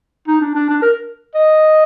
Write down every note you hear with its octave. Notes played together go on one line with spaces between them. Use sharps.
D#4
D4
D4
D4
A#4
D#5